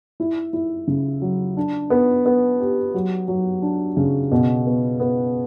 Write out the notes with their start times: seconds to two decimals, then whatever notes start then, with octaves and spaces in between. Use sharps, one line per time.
0.20 E4
0.53 E4
0.87 C#3
1.22 F#3
1.57 D4
1.90 B3
2.26 B3
2.60 G4
2.94 F#3
3.28 F#3
3.62 D4
3.97 C#3
4.32 B2
4.66 B3
5.00 B3